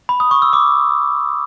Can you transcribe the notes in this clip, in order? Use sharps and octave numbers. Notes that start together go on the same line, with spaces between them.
B5
D#6
C#6
E6
D6